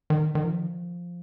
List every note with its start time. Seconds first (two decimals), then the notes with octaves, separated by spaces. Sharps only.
0.10 D#3
0.35 D#3
0.44 F3